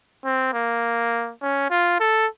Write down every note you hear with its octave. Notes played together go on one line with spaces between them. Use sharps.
C4
A#3
C#4
F4
A4